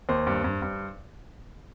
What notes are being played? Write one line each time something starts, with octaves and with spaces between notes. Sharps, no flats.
D#2 C5
G2
G2
G2